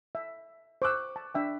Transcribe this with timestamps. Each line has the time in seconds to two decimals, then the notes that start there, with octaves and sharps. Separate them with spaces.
0.15 E5
0.82 C5 C#6 D6 E6 F#6
1.16 A5
1.35 D4 E5 G5